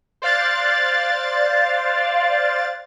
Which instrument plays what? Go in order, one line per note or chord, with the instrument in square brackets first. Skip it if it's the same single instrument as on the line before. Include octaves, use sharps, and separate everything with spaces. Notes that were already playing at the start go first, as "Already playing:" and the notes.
[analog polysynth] C5 D5 F5 F#6 A6